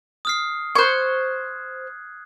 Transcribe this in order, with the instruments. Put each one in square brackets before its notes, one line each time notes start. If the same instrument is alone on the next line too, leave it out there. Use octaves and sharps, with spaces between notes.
[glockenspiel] D#6 F6 C7
[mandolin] C5 C#6 [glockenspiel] F#6 G#6